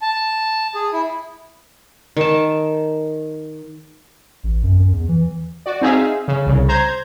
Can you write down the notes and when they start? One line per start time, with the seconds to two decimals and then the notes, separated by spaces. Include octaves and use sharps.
0.02 A5
0.75 G#4
0.93 E4
2.17 D#3 A5
4.44 A1
4.63 F#2
4.79 F#2
4.92 E2
5.08 E3
5.66 F#4 D5
5.82 C4 D#4 G#4 E5 F5
6.28 C#3
6.46 C2 C#3
6.68 C5 A#5 G6 G#6